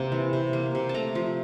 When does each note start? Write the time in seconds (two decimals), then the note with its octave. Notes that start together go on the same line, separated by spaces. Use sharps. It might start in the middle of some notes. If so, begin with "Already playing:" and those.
Already playing: C3 A#3
0.12 E3
0.33 C3
0.53 A#3
0.75 C3
0.89 A5
0.94 A3 A#5
1.15 F3